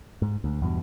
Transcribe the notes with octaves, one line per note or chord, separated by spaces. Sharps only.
G#2
D2
E2 G2 B2